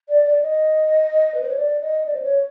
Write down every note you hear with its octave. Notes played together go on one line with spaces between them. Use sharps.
D5
D5
D#5
B4
C5
C#5
D5
D#5
D5
C5
C#5